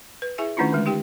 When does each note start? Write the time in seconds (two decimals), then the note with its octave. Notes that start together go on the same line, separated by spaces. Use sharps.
0.22 B4
0.38 E4 G#4 E5 G#5
0.57 D#3 A3 C#4 D4 E4 F4
0.73 D3 G#3
0.86 D#4 G4 G5